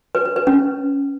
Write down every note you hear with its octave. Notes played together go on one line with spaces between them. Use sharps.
B4
B4
B4
C#4